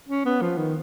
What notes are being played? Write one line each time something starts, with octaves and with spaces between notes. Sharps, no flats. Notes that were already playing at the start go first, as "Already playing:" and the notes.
C#4
B3
F3
D#3